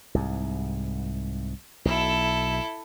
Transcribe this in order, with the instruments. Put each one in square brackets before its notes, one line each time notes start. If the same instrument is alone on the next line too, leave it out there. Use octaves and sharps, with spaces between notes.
[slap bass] C2 G#2
[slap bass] B1 [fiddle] E4 A4